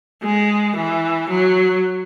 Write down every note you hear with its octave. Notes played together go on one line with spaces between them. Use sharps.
G#3
E3
F#3